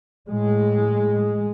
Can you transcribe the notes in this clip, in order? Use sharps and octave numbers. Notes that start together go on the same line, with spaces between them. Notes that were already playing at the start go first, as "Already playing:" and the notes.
A2 G#3